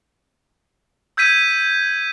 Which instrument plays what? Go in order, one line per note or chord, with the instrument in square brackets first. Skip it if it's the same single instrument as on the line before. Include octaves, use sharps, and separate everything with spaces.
[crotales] E6 G6 G#6 B6 D#7